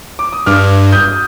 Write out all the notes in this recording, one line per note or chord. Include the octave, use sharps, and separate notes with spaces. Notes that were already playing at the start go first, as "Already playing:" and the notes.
D6
D#6
G2 D6 F6
D#6 G6